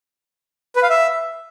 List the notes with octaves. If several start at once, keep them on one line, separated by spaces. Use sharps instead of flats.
B4
F5
E5